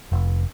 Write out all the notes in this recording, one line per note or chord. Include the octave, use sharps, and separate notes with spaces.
F1